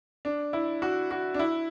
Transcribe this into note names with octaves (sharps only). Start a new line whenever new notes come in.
D4
E4
F#4
F#4
D4
E4